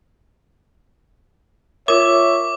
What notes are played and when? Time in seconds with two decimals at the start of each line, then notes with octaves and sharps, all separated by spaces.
1.88 F4 A#4 C#5 E5 D6